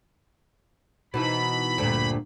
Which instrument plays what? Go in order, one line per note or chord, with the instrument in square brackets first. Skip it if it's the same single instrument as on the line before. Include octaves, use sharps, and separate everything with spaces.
[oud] B2 E3 D#4 [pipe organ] B5
[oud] D2 G2 A#2